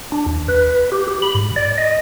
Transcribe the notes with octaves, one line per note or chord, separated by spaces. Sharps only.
D4
D#2
B4
G4
G4
B5
G#2
D5
D#5